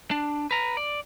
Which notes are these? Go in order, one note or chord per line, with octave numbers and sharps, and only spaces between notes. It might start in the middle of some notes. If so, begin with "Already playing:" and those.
D4
B4 A#5
D5